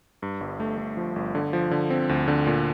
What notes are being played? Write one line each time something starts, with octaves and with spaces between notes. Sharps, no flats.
G2
G1
A3
A3
F3
G1
D3
F3
D3
C4
D2
D3
A#2